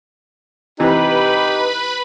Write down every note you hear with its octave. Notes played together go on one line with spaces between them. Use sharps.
C3 E3 D#4 G4 B4 B5